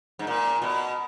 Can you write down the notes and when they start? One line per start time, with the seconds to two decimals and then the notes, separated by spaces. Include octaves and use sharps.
0.19 G#2
0.27 A#2
0.62 B2